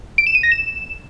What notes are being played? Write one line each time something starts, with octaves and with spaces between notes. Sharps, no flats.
D7
E7
D#7
A#6
E7